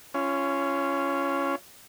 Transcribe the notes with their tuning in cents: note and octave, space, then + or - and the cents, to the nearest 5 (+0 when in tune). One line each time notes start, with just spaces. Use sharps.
C#4 +5 F4 -25